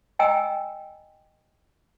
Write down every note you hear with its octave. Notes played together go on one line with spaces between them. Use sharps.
D#5 G5 G#5 A#5 E6